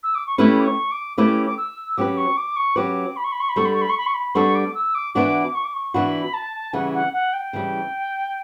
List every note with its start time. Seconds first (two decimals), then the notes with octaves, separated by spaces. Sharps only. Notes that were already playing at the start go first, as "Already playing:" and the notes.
0.03 E6
0.15 D6
0.27 C#6
0.38 A3 C#4 E4 G4 B4 B5
0.59 D6
0.65 C#6
0.91 D6
1.18 A3 C#4 E4 G4 B4 D6
1.46 D6
1.57 E6
1.97 F#3 C#4 G4 B4 D6
2.17 C#6
2.37 D6
2.56 C#6
2.76 F#3 C#4 G4 B4 D6
3.16 B5
3.24 C#6
3.32 B5
3.40 C#6
3.49 B5
3.56 G3 B3 D4 A4 C#6
3.66 B5
3.74 C#6
3.82 B5
3.89 C#6
3.98 B5
4.06 C#6
4.14 B5
4.35 G3 B3 D4 A4 C#6
4.55 D6
4.74 E6
4.95 D6
5.14 E3 B3 D4 F#4 D6
5.55 C#6
5.64 D6
5.74 C#6
5.94 E3 B3 D4 F#4 B5
6.34 A5
6.73 C#3 E3 G3 F#5
6.93 F#5
7.13 F#5
7.33 G5
7.53 C#3 E3 G3